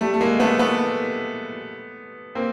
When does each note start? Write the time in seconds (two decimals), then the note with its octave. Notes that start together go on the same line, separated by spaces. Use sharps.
0.01 G3 A3
0.14 A3
0.21 G#3 A#3
0.40 A3 B3
0.59 A3 B3
2.35 A#3 C4